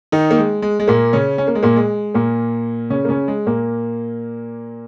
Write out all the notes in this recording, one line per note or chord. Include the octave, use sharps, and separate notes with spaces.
D#3 D#4
A#3
G#3
G#3
G#3
A#2 A#3
C#3 C#4
C#4
A#3
G#3
A#2 A#3
G#3
A#2 A#3
C#3 C#4
A#3
C#3 C#4
G#3
A#2 A#3